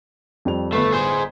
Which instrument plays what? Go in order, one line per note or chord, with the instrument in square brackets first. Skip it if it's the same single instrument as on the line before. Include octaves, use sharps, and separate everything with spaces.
[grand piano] F2 G3 F7
[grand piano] G1 B4 C7 [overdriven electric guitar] A3
[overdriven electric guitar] G#4 C5